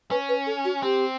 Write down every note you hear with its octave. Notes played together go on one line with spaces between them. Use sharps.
C#4 B4
B4
A4
F#4
C4 G4